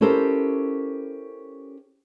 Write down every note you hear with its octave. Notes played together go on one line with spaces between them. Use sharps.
C#4 E4 G4 A4 A#4 C5